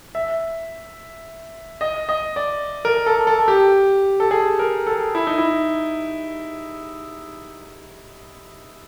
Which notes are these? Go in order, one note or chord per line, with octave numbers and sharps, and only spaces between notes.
E5
D#5
D#5
D5
A#4
A4
A4
G4
A4
G#4
A#4
A4
E4
D#4
E4